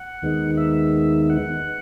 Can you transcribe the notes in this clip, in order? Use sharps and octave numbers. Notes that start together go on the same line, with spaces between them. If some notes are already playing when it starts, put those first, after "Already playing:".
Already playing: F#5
D#2 D#3 G#3 B3 D#4
E5
F#5